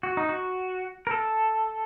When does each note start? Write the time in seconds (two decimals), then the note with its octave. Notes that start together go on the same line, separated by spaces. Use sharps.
0.03 F#4
0.17 D#4
0.29 F#4
1.07 A#4
1.11 A4